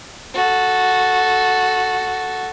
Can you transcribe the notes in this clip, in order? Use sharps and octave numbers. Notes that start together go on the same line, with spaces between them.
F#4 A4